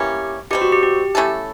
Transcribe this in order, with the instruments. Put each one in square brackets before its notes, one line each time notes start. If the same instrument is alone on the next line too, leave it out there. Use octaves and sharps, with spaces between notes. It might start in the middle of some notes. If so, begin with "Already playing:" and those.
Already playing: [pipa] E3 G3 A#3 C#4 [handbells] G4
[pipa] B2 G3 C4 [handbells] G4
[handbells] F#4
G4
G4
[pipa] A3 C#4 E4 A4